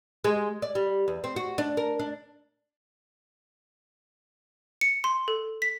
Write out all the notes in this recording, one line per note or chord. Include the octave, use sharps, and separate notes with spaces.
G#3
D5
G3
E2
C4
F#4
D4
A#4
D4
C#7
C6
A4
B6